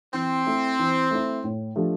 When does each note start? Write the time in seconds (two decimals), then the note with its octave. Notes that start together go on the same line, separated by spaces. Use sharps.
0.14 E3 C4
0.46 A3 E4
0.79 E3
1.11 A3 E4
1.44 A2
1.76 F3 A3 D4 G4